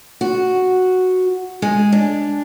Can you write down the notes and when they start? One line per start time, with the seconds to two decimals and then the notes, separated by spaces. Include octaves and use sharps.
0.21 F#4
1.62 G#3
1.92 D4